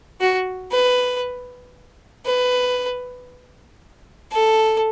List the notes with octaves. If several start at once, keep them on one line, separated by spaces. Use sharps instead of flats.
F#4
B4
B4
A4